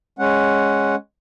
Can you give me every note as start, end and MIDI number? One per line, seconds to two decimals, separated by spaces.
0.19 0.95 56
0.19 0.95 61
0.19 0.95 78